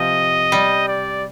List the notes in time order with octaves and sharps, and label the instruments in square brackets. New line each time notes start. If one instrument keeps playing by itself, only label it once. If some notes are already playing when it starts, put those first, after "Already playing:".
Already playing: [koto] C3 F3 [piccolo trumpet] D#5
[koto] G3
[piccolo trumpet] D5